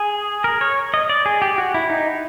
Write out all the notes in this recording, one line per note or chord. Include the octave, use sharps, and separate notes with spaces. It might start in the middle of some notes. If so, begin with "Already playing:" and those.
Already playing: G#4
A#4
C#5
D#5
D5
G#4
G4
F#4
E4
D#4